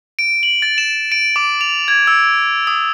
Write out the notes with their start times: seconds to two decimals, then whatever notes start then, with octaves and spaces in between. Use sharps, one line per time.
0.19 D7
0.43 F#7
0.62 A6
0.78 E7
1.12 D7
1.36 D6
1.61 F7
1.88 G#6
2.07 E6
2.67 D#6